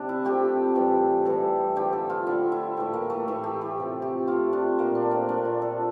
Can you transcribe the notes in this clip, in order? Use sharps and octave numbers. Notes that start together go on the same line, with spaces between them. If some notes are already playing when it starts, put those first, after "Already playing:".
Already playing: C3 D4
E4
C3 F3 A3 G4
A2 E3 G3
A2 E3 G3 A4
D3 F3 A3 G4
A4
F4
D3 F3 A3 E4
E4
A2 E3 A3 G4
A#3
A3
A2 E3 A3 E4
G4
G4
C3 F3 A3
G4
C3 F3 A3 F4
D4
A#2 F3 A3 A#3
D4
C4
A#2 F3 A3 D4
F4
A4